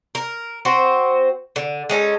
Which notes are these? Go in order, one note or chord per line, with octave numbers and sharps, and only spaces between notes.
A#4
C4 F#4 C5
D3
G#3 C#4 D#4 A4